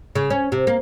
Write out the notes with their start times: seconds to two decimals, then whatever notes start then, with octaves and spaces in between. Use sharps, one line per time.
0.15 C#3
0.30 C#4
0.52 C3
0.67 A#3